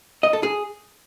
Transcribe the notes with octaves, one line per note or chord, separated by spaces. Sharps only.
D#5
A4
G#4